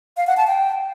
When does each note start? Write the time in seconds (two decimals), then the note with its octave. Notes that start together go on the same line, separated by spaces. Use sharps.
0.17 F5
0.27 F#5
0.37 A5
0.47 G5